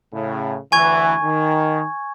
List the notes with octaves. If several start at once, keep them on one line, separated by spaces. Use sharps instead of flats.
A2 C#3
D2 E3 G#5 C#6 G#6
D#3